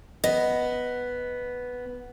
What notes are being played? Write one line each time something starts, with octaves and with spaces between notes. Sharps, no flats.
B3 D#5